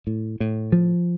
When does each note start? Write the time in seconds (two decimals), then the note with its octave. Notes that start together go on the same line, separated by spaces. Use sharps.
0.07 A2
0.40 A2
0.72 F3